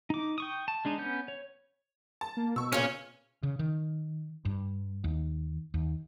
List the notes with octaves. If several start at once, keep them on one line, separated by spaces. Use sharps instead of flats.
D#4 D6
G5 C#6 D#6
A5
G#3 D4 D#4
B3 C#4 G6
C#5
A5
A#3
B2 C#6 E6
A#2 C#3 C#4 C#5 F6
C#3
D#3
G2
D#2
D#2